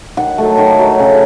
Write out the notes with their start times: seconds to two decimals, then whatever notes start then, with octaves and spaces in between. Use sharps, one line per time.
0.17 D#3 F#5
0.38 F#3 A3
0.58 D#3
0.79 F#3 A3
0.99 C#3